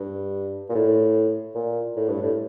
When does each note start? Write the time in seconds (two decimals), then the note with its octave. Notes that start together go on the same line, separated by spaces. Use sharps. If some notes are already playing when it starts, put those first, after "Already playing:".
Already playing: G2
0.69 A#2
0.75 A2
1.55 A#2
1.96 A2
2.09 G2
2.23 A2